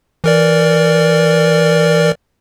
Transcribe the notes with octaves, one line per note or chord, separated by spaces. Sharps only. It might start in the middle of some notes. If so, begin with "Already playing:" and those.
E3 A#4 D5